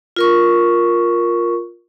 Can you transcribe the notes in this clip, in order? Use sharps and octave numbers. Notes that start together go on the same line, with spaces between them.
F4 A#4 C#6